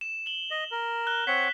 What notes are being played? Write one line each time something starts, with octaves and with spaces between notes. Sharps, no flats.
E7
F#7 G7
D#5
A#4
F#6 G7
C4 C#5 F#5 B6